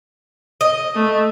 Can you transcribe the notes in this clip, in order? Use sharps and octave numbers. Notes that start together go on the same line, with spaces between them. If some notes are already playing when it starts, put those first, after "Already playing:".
D#5
A3